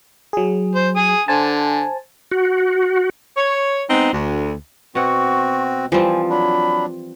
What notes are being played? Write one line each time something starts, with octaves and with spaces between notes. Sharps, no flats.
F#3 G#4
C5
G#5 D#6
D3 C5 G#5 A5
F#4
C#5
G#3 B3 C4 D#4
D2
B2 C4 F#4 D#5 F#5 C#6
E3 F3 G3 C4 G#5
F#3 D4 B5